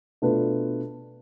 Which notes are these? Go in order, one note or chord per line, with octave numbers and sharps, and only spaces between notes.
B2 A3 D4 F4 B4